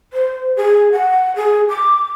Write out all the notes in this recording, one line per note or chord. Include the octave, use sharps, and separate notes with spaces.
C5
G#4
F#5
G#4
D6